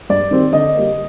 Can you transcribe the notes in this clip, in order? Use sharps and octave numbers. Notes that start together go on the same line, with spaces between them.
G2 D5
D#3 G3 C4
D3 D#5
G3 A#3